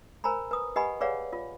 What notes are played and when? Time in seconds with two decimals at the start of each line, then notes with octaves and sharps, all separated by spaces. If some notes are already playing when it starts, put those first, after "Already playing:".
0.24 A#4 C5 G#5 A#5 B5
0.51 B4 D#6
0.76 G4 B4 D#5 F#5 G#5 B5
1.01 G#4 B4 C#5 D5 F5 F#5
1.33 F4